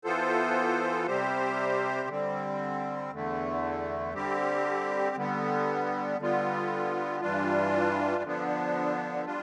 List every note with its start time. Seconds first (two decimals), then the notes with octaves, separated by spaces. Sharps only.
0.04 E3 B3 F4 A4 C5
1.06 C3 G3 C4 G4 C5
2.08 D3 G3 C4
3.12 E2 D3 A3
4.14 D3 G3 C4 G4
5.16 D3 G3 B3
6.18 D3 G3 B3 F4
7.21 G2 E3 G3 D4 F4
8.23 D3 F3 B3 D4
9.26 G3 D4 F4